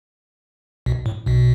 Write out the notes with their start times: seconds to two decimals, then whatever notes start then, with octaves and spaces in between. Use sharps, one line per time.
0.86 B1 B2
1.06 A2
1.26 B1 B2